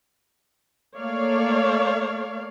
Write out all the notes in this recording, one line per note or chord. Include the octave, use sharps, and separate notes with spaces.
A3 A#3 C#5 D5 F5